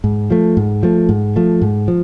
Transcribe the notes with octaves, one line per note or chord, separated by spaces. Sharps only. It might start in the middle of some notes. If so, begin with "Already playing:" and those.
G#2
F3 A3
G#2
F3 A3
G#2
F3 A3
G#2
F3